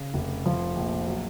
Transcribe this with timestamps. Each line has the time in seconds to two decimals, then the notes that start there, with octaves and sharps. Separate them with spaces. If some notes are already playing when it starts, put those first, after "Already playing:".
Already playing: C#3
0.14 F1
0.46 F3
0.76 A#1
1.06 F#3